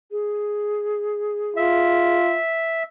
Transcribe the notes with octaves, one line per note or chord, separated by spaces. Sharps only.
G#4
F4 E5